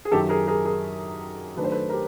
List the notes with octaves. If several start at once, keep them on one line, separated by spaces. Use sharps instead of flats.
G#4
F#2 D#3 F#3 G4 A4
G#4 A#4
G#4 A#4
G#4 A#4
D#3 F#3 A3 D4 B4
C5
A4 B4
A#4
G4